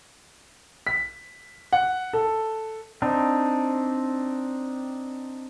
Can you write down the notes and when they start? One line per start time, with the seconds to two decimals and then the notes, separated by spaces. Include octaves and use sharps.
0.87 B6
1.73 F#5
2.13 A4
3.02 C4 D4 D#4